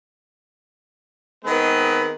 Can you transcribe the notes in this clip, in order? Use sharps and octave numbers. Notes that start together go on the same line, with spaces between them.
D#3 G#3 B3 C4 B4